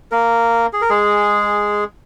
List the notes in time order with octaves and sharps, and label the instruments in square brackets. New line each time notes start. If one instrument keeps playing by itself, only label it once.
[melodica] A#3 A#4
G#4
A#4
G#3 G#4